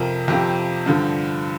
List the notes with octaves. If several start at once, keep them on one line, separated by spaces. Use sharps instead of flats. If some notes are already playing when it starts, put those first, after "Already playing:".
Already playing: F2 C3 F3 A#4
F2 C3 F3 G4
G2 D3 F3